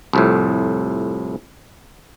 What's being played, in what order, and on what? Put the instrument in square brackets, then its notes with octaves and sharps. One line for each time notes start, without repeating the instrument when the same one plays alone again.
[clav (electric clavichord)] C2 F2 A2